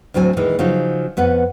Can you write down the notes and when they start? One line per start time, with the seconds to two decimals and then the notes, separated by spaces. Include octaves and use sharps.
0.14 D2 A2 F#3 C4 G#5
0.37 A#2 D#3 E3 G#3
0.59 C#3 F3 F#3 D#4
1.17 F2 B3 B4 F#5